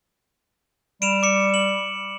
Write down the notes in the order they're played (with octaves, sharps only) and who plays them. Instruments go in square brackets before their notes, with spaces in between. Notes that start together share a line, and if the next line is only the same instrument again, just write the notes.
[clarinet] G3 [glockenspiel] D7 E7 F7
[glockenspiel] D6 C#7
F#7